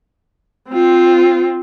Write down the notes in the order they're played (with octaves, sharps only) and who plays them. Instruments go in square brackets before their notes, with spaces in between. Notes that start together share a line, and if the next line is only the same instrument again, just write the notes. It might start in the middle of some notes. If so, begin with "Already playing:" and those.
[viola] C4 F4